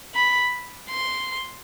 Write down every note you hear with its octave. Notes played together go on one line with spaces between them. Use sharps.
B5
C6